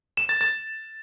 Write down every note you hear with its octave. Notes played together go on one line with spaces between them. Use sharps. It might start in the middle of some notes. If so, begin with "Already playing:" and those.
E7
A6
A6